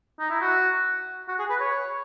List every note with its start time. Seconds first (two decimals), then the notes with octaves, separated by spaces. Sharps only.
0.19 D#4
0.30 E4
0.41 F#4
1.29 F#4
1.39 G#4
1.50 B4
1.61 C#5